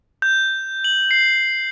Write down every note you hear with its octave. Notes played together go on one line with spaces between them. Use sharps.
G6
F#7
C7